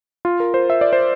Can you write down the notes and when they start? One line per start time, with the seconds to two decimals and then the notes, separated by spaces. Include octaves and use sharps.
0.25 F4
0.40 A#4
0.54 C5
0.70 E5
0.81 D5
0.93 C5